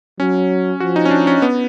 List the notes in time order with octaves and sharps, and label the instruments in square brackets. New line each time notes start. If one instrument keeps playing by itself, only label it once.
[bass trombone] F#3 [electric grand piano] C#4
[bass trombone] F3 [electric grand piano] F#4
[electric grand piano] D#4
C#4
D4
C#4
B3